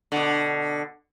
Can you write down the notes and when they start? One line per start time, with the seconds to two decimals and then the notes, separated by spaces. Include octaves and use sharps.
0.12 B2 D3